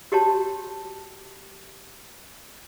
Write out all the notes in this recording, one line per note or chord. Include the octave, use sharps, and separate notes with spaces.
F#4 G4 C#5 A5